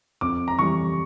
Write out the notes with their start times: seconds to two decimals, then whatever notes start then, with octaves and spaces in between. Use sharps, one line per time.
0.21 F2 D6
0.48 A#5
0.59 E3 G3 C#6